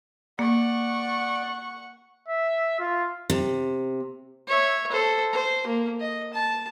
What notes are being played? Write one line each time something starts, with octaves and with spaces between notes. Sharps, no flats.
A#3 D5 F#5 C#6
E5
F4
C3
C#5 E5
A4 C5
C5
A#3
D#5
A5